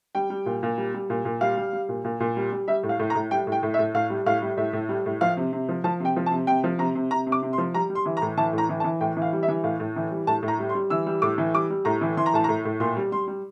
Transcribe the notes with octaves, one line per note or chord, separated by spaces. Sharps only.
G3 G5
G3
A#2
A#2
G3
G3
A#2
A#2
G3 F5
G3
G3
A#2
A#2
A#2
G3
G3
G3 E5
A2
F5
A2
A#5
A2
G3 G5
A2
G5
A2
E5
A2
A2 F5
G3
A2 F5
G3
A2 E5
A2
G3
A2
F3 F5
C3
C3
F3
F3 A5
C3 G5
F3
A5
C3
C3 G5
F3
C3 A#5
C3
C3 A#5
C3
D6
C3
C6
F3
G3 A#5
G3
C6
E3
A#5
A2
E3 A5
A2
A#5
E3
A5
E3
A2 G5
E3
F5
G3
E5
E3
A2 F5
A2
E3
G3
A2 A5
A2
A#5
G3
C6
G3
E3 E6
G3
A2 D6
E3
G3 D6
G3
A2 A#5
E3
E3 C6
A#5
A2 A5
A2 A#5
A2
A#2 C6
G3
G3 C6
G3